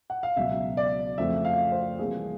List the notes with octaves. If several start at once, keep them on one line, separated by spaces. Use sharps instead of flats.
F#5
F5
C#2 B2 F#3 E5
D5
F2 C#3 F3 A3 E5
F5
C5
C2 C3 E3 G3 A#3 G#4